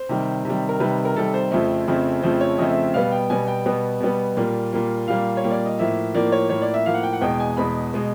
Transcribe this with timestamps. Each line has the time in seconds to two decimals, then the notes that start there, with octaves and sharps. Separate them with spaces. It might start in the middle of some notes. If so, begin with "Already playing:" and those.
Already playing: C5
0.09 C3 D#3 G3
0.45 C3 D#3 G3
0.69 A#4
0.80 C3 D#3 G3 B4
1.05 A#4
1.16 C3 D#3 G3 A4
1.34 C5
1.51 F2 C#3 F3 A3 C4
1.88 F2 C#3 F3 A3 C4
2.22 F2 C#3 F3 A3 C4 C5
2.41 C#5
2.58 F2 C#3 F3 A3 C4 D#5
2.70 E5
2.83 E5
2.94 B2 G3 B3 F5
3.12 G5
3.30 B2 G3 B3 G#5
3.48 G5
3.66 B2 G3 B3
4.00 B2 G3 B3
4.37 A#2 G3 A#3
4.72 A#2 G3 A#3
5.08 A#2 G3 A#3 F5
5.37 C#5
5.44 A#2 G3 A#3
5.51 D5
5.65 D#5
5.79 A2 F3 A#3 E5
6.15 A2 F3 A#3 D5
6.32 C#5
6.50 A2 F3 A#3 C#5
6.62 D5
6.74 E5
6.86 A2 F3 A#3 F5
6.94 F#5
7.03 G5
7.13 F#5
7.21 E2 B2 G#3 G5
7.40 G#5
7.57 E2 B2 G#3 B5
7.94 B2 G#3